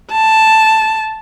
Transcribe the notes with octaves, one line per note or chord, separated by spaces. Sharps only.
A5